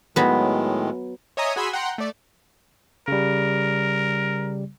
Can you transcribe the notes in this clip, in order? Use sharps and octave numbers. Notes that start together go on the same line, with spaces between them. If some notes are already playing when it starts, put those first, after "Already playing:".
A2 D#3 F#3 G#3 B3
C#5 D#5 E5 G#5 A#5 D#6
F#4 G#4 G#5 B5 C6 E6
F#5 G5 A#5 C6
A3 D5
C#3 G3 A#4